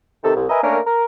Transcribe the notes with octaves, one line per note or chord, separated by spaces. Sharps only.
C3 D#3 A4
C2
A#4 B4 D#5 E5 G#5 A#5
A3 A#3 C#4 D4 A#4
A#4